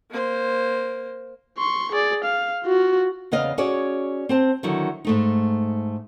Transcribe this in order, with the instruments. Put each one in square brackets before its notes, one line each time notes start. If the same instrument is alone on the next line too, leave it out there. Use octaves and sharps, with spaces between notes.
[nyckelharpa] A#3 C5
[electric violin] C6 C#6
G#4 D5
F5
F4 F#4
[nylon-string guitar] E2 C#3 B3 D#5 F5
C#4 F#4 G#4 C#5 D5
C4 C5 A5
D3 D#3 F#3 E4
G#2 A3 D#4